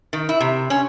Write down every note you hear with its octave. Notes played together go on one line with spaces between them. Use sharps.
D#3
E4
C3
C#4